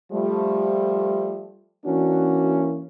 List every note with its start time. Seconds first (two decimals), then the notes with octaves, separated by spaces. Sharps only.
0.12 F3 G3 A3
1.85 E3 A#3 C#4 D4 F#4